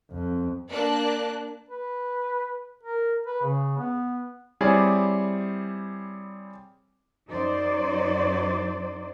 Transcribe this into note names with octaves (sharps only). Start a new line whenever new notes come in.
F2
A#3 D4 D5 F#6
B4
A#4
B4
C#3
B3
G3 C4 E4 G#4 C#5 D5
F#2 F#3 D#4 C5 D5